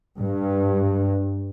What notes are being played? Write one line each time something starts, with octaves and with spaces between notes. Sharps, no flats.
G2